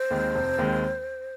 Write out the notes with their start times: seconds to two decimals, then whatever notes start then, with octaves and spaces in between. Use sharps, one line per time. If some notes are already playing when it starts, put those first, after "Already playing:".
Already playing: C5
0.11 D#2 D#3 G#3 C4
0.35 F1
0.58 D#2 D#3 G#3 C4